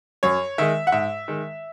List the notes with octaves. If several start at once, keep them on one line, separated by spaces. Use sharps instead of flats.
F#2 C#5
D#3 G#3 E5
F#5
G#2 E5
D#3 G#3